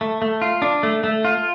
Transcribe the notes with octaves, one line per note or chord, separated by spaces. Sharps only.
A3
A3
F4
D4
A3
A3
F4